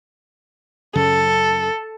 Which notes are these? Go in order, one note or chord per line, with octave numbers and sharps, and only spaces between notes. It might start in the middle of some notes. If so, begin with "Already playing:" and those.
F#2 C#3 F#3 A4